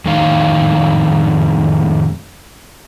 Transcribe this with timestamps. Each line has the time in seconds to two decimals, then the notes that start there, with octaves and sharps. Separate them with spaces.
0.05 F2 A2 D#3 D#4 F5